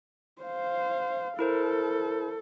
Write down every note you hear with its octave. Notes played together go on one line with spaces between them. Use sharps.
C5 F5
E4 A4 A#4 C5